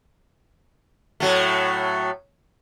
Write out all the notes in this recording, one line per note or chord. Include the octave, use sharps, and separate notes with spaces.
A2 F#3 A3